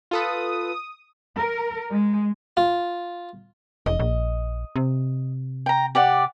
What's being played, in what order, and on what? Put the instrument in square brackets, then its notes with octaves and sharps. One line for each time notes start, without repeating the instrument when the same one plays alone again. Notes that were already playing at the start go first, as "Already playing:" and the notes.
[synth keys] F4 A4 B4 [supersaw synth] D#6
[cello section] A#4
G#3
[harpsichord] F4
[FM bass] E1 [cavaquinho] D#5
[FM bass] A#1
C3
[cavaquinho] G5 A#5
G4 D5 F#5